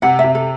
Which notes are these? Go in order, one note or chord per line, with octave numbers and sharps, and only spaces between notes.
C3 F#5
E5
C3
A4